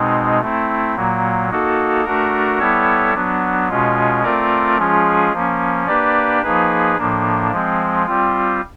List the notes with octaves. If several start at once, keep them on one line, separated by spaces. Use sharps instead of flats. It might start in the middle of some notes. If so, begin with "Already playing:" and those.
Already playing: B2 G#3 C4 D#4
A3 C4 E4
A#2 F#3 A#3
A#3 D#4 F#4 A4
A3 D4 F#4 A#4
G3 B3 E4 A4 C#5
F#3 B3 D4
B2 G#3 C#4 F4
A3 C4 F4 A#4 D5
F3 G#3 C#4 F4 G#4
F3 A#3 C#4
A#3 D4 G4 B4 D5
F3 A#3 D#4 G#4 B4
A2 F3 A#3 D4
F3 G#3 C4
G3 C4 F4